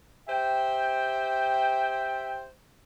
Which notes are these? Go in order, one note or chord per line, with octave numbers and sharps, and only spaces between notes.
G4 C5 E5 G5